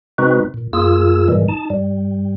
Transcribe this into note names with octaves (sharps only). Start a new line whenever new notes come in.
C3 G#3 C4 D#4 F#4 B4
A#2
F#2 A#3 F4 G#4 E6
G#2 B2 D#3 E3 G3 G#3
D#4 A5
G2 G3